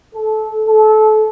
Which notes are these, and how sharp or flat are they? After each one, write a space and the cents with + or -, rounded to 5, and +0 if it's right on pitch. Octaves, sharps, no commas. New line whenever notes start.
A4 -20
A4 -25